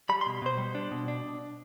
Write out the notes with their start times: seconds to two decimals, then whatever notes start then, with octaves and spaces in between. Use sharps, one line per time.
0.09 G3 B5
0.21 C6
0.26 B2
0.42 B2 C5
0.58 G3
0.75 D4
0.91 B2
1.08 D4